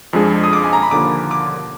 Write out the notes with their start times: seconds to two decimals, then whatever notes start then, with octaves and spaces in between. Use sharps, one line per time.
0.13 F2 F3 G#3 D4 G#4
0.43 D#6
0.53 D6
0.64 G#5
0.73 A#5
0.82 B5
0.91 D#2 D3 F3 A#3 D6
1.31 D6